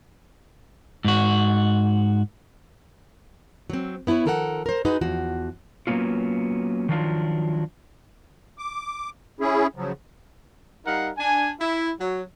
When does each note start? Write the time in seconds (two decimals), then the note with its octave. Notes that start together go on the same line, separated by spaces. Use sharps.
1.05 G#2 F#4
3.70 F#3 C4
4.07 B3 E4 G#4 B4 C#5
4.25 D#3 F3 A4 A#4 C5 F#5
4.66 A#4 C5
4.85 D#4 F#4 G#4 B4 C5
5.01 E2 F3 F#4
5.87 F#3 A#3 B3 C#4 F4
6.89 D#3 F3 F#3 D4 F4
8.58 D6
9.40 C#4 E4 G#4
9.76 C#3 F3 F#3
10.86 G3 D#4 A#4 F5 F#5
11.17 D4 G#5
11.60 E4
12.01 F#3